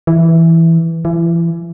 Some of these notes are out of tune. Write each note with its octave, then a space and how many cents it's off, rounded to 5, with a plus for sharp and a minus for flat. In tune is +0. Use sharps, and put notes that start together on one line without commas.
E3 +0
E3 +30